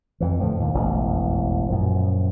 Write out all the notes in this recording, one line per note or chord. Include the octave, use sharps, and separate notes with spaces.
F2 E3
A2 D3 F3
D#2 A#2
E1 A1 F2
F#2 A#2 F3